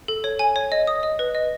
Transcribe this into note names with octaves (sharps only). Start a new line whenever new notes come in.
A4
C#5
G#5
C#5
D#5
D#6
D#5
B4
D#5